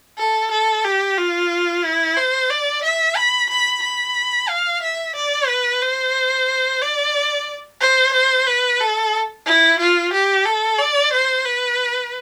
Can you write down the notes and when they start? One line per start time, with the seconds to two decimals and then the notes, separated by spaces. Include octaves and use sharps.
0.18 A4
0.51 A4
0.84 G4
1.18 F4
1.84 E4
2.16 C5
2.50 D5
2.83 E5
3.16 B5
3.49 B5
3.83 B5
4.49 F5
4.82 E5
5.15 D5
5.48 B4
5.82 C5
6.82 D5
7.80 C5
8.13 C5
8.47 B4
8.80 A4
9.46 E4
9.80 F4
10.13 G4
10.45 A4
10.79 D5
11.13 C5
11.45 B4